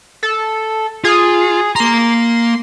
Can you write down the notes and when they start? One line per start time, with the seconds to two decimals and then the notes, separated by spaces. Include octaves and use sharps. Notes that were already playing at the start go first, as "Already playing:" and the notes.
0.23 A4
1.04 F4 G#4
1.76 A#3 A#5 C6